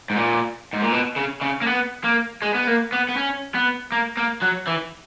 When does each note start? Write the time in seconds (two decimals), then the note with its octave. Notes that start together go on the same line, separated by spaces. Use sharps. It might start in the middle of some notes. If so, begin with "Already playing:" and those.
0.10 G#2
0.16 A#2
0.73 G#2
0.82 A#2
0.92 B2
1.16 C#3
1.42 C#3
1.62 A#3
1.67 B3
2.04 A#3
2.42 G#3
2.54 B3
2.67 A#3
2.92 B3
3.09 B3
3.17 C#4
3.54 B3
3.92 A#3
4.17 A#3
4.42 F#3
4.68 E3